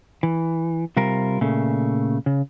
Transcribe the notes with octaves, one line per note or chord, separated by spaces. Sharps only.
E3
C3 G3 F4 A#4
A#2 C#3 A3
C#3